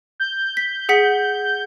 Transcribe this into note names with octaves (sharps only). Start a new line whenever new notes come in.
G6
B6
G#4 F#5 B6